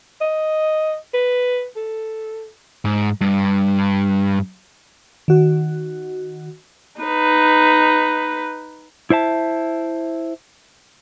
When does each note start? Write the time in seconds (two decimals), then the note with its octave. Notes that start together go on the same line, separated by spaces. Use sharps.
0.21 D#5
1.14 B4
1.76 A4
2.85 G#2
3.21 G2
5.28 D#3 F#4
7.01 D#4 B4
9.10 E4 C5 E5 A5